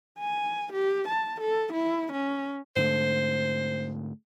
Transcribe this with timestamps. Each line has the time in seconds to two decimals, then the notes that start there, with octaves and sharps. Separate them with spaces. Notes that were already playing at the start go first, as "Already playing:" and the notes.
0.19 G#5
0.72 G4
1.08 A5
1.40 A4
1.73 E4
2.12 C#4
2.76 G#2 D3 A3 C5